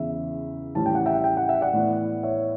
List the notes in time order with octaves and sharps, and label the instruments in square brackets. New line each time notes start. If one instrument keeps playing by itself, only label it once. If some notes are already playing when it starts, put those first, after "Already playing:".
Already playing: [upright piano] E2 C#3 E3 [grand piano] E5
[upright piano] A2 E3 G3 C#4 [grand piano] A5
[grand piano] G5
F#5
E5 G5
G5
F#5
E5
D5 F#5
[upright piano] A2 E3 B3
[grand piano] C#5 E5